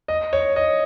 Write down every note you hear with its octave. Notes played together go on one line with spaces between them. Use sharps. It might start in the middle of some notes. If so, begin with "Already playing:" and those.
D#5
C#5
D#5